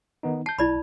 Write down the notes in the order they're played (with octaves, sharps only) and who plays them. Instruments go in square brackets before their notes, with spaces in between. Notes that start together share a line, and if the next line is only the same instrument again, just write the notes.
[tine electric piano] D#3 B3 D#4
[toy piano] A5 [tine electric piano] G6 C7
[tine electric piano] B1 [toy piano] E4 D5 B5